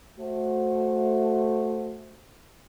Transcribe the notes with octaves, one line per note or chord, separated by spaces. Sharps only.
A3 F#4 C5